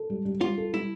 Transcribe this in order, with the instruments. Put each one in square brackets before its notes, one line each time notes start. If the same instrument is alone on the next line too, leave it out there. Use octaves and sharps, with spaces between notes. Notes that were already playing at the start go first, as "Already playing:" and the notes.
Already playing: [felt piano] A4
G3
G3
[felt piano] G3 [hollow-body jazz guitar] F4
[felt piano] A4
[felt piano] G3 [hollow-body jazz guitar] E4